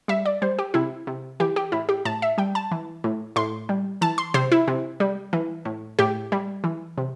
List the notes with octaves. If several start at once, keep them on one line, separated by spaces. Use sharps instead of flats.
G3 E5
D5
G3 C5
G4
C3 E4
C3
E3 G4
G4
A2 E4
G4
A2 A5
E5
G3 G5
A5
E3
A2
A2 C6
G3
E3 A5
C6
C3 C5
E4
C3
G3
E3
A2
A2 G4
G3
E3
C3